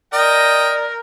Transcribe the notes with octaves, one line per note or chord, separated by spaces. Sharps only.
A#4 D5 D#5 G5